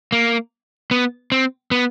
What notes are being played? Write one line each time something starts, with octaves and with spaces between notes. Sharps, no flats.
A#3
B3
C4
B3